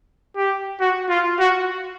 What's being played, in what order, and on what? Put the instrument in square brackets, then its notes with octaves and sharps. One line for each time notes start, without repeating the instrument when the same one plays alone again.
[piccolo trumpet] G4
F#4
F4
F#4